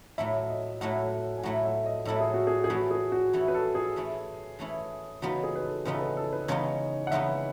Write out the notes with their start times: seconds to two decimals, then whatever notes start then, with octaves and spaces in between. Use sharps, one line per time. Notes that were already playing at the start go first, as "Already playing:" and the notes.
0.18 A2 F#3 A3 E4 E5
0.49 D#5
0.81 A2 F#3 A3 E4 F#5
1.38 G#5
1.43 A2 F#3 A3 E4 F#5
1.65 E5
1.86 D#5
2.05 A2 F#3 A3 E4 A4
2.20 G#4
2.34 F#4
2.47 G#4
2.64 G#4
2.70 E3 A3 C#4 E4 F#4
2.91 G#4
3.12 F#4
3.33 E3 A3 C#4 E4
3.48 B4
3.54 A4
3.75 G#4
3.96 E3 A3 C#4 E4
4.59 E3 A3 C#4 E4
5.22 E2 C#3 G#3 B3 D#4 F#4
5.44 G#4
5.56 B4
5.64 A4
5.85 E2 C#3 G#3 B3 D#4 B4
5.94 A4
6.01 B4
6.17 A4
6.33 B4
6.48 E2 C#3 G#3 B3 D#4 C#5
7.07 F#5
7.11 E2 C#3 G#3 B3 D#4 E5